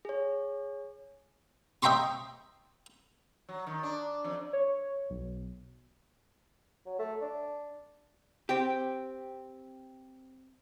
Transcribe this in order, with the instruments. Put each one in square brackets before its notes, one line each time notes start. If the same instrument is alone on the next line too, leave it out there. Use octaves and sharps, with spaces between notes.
[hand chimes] G#4 C#5
[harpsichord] D#5 E5 G5 A#5 C6 C#6
[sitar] F#3
D#3
D4
F2
[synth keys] C#5
B1
[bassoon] F#3
A3
D4
[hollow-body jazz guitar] C4 G4 [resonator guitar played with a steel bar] G5